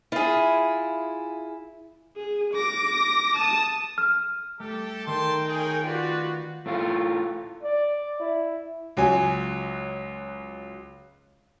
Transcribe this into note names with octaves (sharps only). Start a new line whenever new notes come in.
E4 F4 G#4
G#4
D6 A#6
A5 D#6
F6
A3 G4 A4
D#3 A4 A#4 G5 A5 C6
C#4 D#4 G#4
F4 F#4 B4 D5 G5 C6 G#6
A2 A3 F4
D5
E4
C#2 F#3 G#5